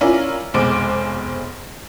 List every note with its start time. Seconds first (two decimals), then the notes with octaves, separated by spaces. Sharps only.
0.01 C#4 E4 F4 A#4 D5
0.54 F1 B1 G#3 C5 D6 D7